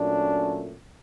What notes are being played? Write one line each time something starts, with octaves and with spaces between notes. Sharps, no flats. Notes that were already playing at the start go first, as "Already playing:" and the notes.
Already playing: A#2 F#3 A3 C#4 D4